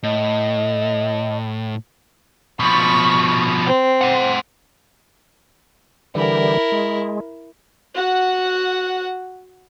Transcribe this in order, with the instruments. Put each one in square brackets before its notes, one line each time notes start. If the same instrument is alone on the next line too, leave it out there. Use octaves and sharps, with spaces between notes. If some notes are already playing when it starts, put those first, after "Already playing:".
[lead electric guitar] A2 [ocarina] D#5
[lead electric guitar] B2 F3 [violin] B5 C#6
[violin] C4
[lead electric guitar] C5 F#5
[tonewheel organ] D3 E3 G3 [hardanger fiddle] E4 A#4
[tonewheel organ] G#3
[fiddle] F#4 F#5